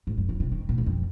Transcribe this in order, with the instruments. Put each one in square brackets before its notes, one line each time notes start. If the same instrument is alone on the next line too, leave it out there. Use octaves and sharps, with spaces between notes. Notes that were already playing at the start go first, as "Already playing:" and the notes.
[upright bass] G#2
F#2
C#3
C3
D#3
A#2
G#2
F2